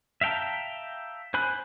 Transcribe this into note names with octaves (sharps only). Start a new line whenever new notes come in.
E5 F5 G5 A5 A#5
C5 G#5 B5 F#6